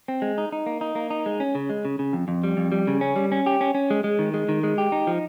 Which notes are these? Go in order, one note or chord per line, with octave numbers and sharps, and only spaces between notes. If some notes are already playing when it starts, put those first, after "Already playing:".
C4
G#3
D#4
D#4
A#3
D#4
A#3
D#4
G#3
C#4
C#3
G#3
C#3
C#3
F2
F2
G3
F2
G3
C#3
C#4
G3
C#4
G4
C#4
C#4
G#3
G#3
D#3
G#3
D#3
G#3
G4
D#4
F3